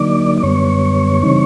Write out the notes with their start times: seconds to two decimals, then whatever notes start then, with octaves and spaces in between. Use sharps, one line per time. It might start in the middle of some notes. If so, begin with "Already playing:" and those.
Already playing: D3 F#3 A#3 D#4 D5 D6
0.38 D6
0.43 F#2 D3 G3 B3 C#5 C#6
1.23 C#3 E3 G3 C4 D#4